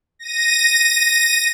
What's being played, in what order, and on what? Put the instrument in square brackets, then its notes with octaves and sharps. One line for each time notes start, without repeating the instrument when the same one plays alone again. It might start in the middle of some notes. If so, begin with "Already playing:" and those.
[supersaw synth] A#6 D#7